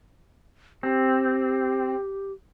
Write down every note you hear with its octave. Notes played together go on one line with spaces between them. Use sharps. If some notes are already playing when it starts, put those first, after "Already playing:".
C4 G4